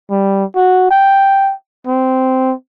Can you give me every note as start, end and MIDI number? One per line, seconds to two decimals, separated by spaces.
0.10 0.44 55
0.56 0.86 66
0.91 1.53 79
1.87 2.54 60